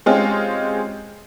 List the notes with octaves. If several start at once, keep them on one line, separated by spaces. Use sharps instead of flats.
G#3 C4 C#4 D#4 F4 G4